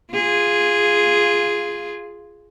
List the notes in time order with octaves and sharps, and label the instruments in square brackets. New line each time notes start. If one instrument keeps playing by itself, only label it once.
[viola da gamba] F4 G#4